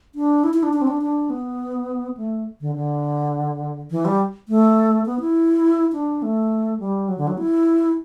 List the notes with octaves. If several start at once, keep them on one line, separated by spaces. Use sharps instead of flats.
D4
E4
E4
D4
D4
C4
D4
D4
B3
A3
D3
D3
E3
G3
A3
B3
E4
D4
A3
G3
F#3
D3
F#3
E4